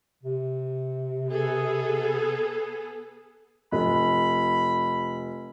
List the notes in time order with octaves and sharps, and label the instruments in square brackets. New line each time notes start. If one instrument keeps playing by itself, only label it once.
[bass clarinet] C3
[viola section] B3 G#4 A4
[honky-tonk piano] F1 [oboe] B5